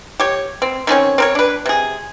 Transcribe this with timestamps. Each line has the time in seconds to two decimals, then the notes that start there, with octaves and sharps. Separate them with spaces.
0.20 G4 C#5
0.62 C4
0.87 D#3 C4 C#4 C#5
1.18 C4 A#4 C#5
1.35 D4 B4
1.66 C3 G#4